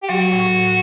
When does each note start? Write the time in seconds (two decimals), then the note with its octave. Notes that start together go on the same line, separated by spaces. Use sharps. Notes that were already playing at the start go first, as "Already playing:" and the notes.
0.03 G4
0.09 F#3 F#4
0.32 A2
0.54 A2